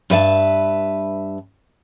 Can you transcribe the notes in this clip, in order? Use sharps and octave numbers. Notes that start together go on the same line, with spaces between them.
G2 B4 E5 A5